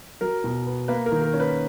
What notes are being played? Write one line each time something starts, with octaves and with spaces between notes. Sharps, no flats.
F#3 A#4
B2
B3
A#3 B4
A#4
D#3
A#4
C#4
B4